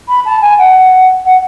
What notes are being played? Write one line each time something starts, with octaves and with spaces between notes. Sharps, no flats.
B5
A5
G#5
F#5
F#5